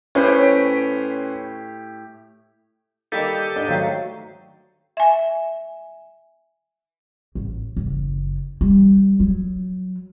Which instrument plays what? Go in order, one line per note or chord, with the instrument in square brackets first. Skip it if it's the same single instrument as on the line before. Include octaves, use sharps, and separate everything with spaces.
[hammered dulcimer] A2 G4 [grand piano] C#4 B4 C5
[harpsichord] D#3 G3 A#3 [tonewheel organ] D#4 G4 A4
[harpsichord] G#2 [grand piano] D4
[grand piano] D#3 F#3 A3 [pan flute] F5
[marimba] E5 G#5
[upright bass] A1
F#1
G3
F#3